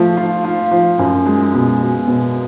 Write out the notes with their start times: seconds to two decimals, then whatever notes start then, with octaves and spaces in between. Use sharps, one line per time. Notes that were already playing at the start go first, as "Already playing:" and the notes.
Already playing: F3 A3
0.17 F4
0.45 F4
0.71 F3
0.99 F#2
1.26 G#3
1.54 B2
1.81 B2
2.08 B2